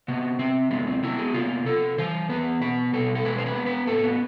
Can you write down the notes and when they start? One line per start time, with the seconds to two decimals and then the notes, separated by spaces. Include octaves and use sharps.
0.08 C3 B3
0.39 C3 C4
0.71 G#3 B3
0.87 C4
1.03 B3 E4
1.19 G#4
1.34 C3 F4
1.66 C3 A4
1.98 E3 C5
2.29 B3 B4
2.61 B2 B4
2.93 B2 A4
3.15 A4
3.24 G#3 B4
3.38 C5
3.46 B4
3.57 B3
3.66 B4
3.87 A2 A4
4.03 B3